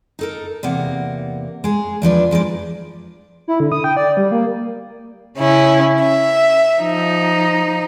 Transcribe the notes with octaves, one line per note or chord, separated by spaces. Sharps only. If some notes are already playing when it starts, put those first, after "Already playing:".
D#4 A4 A#4
E2 C3 A#3 F#5
G#3 G#4
E2 F3 D4 B4
F3 G#3 D#4 D5
E4
D3
D#6
G5
D5
G3
A#3
C#3 C#4 E4
E5
F3 D#4